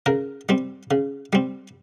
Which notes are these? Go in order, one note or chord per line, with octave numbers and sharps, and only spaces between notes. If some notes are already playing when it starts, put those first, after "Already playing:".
C#3 A#4
G3 C4
C#3
G3 C4